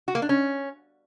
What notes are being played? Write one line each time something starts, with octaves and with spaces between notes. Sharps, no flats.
F#4
A#3
D4
C#4